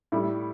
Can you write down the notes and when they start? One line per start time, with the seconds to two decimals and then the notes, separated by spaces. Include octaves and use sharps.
0.12 A2 G3 E4 G4